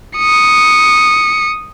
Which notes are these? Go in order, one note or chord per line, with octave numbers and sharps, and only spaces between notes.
D#6 C#7